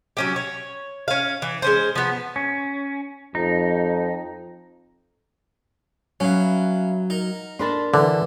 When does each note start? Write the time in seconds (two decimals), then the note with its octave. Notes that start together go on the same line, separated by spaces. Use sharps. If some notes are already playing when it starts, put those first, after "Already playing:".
0.17 F#3 C#4 G4
0.36 C#5
1.08 C#4 F5
1.42 E3
1.62 G#3 C#4 C5
1.95 F3 B3
2.36 C#4
3.35 F2 D#4
6.20 F#3 C#4 E4 B4 F5
7.10 D#4 A#4
7.59 D4 A#4 A5 B5 C6
7.94 D3 E3